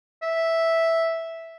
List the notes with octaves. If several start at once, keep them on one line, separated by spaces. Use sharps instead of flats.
E5